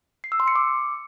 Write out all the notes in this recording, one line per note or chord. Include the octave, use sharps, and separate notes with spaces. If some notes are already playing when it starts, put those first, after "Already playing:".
C7
E6
C6
C#7
D6